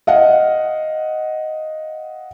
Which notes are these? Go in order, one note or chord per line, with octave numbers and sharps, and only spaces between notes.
D#5 F5 F#5